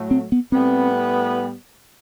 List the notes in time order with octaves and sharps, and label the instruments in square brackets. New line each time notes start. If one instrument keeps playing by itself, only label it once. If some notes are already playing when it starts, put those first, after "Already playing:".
Already playing: [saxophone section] A2 F#3 A3
[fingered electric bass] C4
B3
[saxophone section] A2 G3 B3 [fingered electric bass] C4